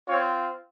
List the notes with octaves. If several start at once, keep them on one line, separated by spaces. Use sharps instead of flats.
C4 F4 C#5